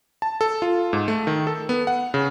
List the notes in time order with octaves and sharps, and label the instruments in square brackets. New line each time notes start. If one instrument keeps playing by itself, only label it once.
[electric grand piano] A5
A4
F4
G#2
A3
D#3
A4
B3
F#5
C#3